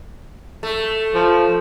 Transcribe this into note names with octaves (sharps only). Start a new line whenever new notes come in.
A3
F3